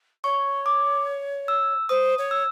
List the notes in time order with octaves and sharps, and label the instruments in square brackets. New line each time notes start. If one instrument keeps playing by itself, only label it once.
[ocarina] C#5 [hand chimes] C#6
[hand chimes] D6
E6
[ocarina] C5 [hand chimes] D#6
[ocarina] C#5
[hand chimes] E6